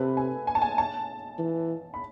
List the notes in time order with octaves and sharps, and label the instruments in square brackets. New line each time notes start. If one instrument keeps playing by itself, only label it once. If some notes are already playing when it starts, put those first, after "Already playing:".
Already playing: [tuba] C3 [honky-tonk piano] A4 B4
[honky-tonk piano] G#5
G#5
A5
G#5
A5
[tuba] E3
[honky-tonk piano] B5